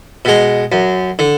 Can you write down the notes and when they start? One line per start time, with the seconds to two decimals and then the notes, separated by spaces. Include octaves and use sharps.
0.25 B2 G#3
0.72 F#2
1.19 D3